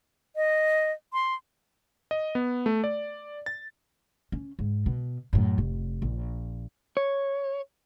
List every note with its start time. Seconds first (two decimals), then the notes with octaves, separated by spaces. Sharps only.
0.36 D#5
1.13 C6
2.11 D#5
2.35 B3
2.66 A3
2.84 D5
3.46 A6
4.32 C#4
4.59 G#2
4.86 B2
5.33 F#2 A2
5.58 F1
6.02 A#1
6.97 C#5